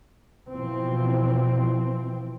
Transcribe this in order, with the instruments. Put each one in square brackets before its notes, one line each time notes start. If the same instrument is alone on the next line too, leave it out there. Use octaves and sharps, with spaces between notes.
[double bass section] B2 E3 F3 C4